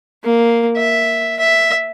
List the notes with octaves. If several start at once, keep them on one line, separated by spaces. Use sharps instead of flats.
A#3
E5
E5